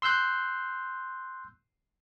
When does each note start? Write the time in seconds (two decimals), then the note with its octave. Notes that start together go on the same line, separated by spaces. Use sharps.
0.02 C6 E6 F#6 G6